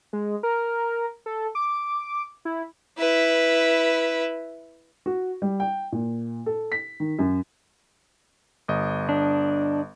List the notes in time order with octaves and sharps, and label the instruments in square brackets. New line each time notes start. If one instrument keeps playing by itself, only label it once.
[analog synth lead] G#3
A#4
A4
D6
E4
[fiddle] E4 B4
[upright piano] F#4
G3
G5
A#2
A4
B6
D#3
F#2
[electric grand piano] G1 D#5
[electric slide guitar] D4